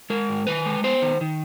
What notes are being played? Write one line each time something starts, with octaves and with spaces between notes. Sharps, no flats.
G#3 A#4
G#2
D#3 B4
G#3
B3 C5
D#3
D#3